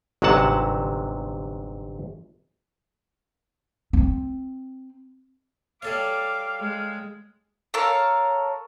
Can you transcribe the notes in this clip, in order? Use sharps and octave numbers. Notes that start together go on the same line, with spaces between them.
G1 G#2 C3 F#3 F#5 A5
C4
G3 A4 C#5 F5 D6
G#3
A4 A#4 C#5 F5